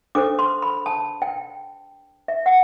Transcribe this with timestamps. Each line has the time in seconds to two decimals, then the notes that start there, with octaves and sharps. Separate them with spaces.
0.15 D4 A4 C5 D6
0.39 C6
0.62 B5
0.86 A5
1.22 G5
2.28 E5
2.46 F#5